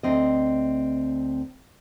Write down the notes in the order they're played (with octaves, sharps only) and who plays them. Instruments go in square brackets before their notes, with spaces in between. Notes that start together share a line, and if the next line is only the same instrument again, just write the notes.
[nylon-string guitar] D2 C4 D#5